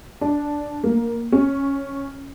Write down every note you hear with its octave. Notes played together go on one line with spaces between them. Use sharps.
D4
A#3
C#4